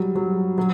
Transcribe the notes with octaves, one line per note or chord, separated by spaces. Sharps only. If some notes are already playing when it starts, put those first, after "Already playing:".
Already playing: F#3 G3
F#3
F#3